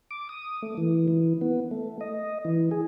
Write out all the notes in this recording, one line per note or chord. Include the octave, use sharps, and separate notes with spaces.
D6
D#6
A3
E3
E3
B3
A3
D#5
E3
G#4